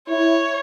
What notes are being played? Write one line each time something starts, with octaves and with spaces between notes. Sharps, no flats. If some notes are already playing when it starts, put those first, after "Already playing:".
E4 C#5